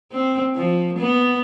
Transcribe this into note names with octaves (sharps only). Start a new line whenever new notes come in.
C4
F3
B3